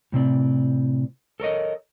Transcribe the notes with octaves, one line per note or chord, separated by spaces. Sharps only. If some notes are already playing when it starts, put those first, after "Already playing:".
A2 C3 C4 D5
A4 A#4 C#5 D#5